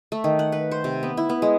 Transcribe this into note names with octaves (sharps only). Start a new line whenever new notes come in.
A3
D#3
F#5
B4
C5
C3
B3
E4
B3
G#3